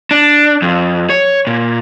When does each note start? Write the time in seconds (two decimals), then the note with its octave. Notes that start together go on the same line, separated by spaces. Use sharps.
0.11 D4
0.62 F2
1.10 C#5
1.47 A#2